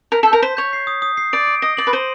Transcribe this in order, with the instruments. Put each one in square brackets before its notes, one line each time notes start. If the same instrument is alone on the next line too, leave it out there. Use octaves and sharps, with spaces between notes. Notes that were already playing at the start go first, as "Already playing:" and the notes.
[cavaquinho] A#4 [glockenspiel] B6
[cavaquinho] A4
[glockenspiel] G6
[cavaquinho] A#4
[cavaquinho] C5 [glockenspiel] B6
[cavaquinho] C#5 [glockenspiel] G6
[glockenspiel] C7
D#6
D#6
C7
[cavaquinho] D5 [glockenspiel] D7
[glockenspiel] D7
[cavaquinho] D#5 [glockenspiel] A#6
[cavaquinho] D5 [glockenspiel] F#7
[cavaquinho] B4
[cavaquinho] C5 [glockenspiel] D#7